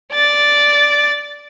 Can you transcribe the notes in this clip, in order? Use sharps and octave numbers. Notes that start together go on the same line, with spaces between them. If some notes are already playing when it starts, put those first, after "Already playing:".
D5 A6